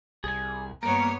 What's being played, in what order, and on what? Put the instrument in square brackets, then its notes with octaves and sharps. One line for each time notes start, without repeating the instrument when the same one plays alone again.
[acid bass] C2 [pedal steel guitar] G#4 G#5
[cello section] G2 B3 C#5 [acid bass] A#3 [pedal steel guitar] A#4 [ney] A#5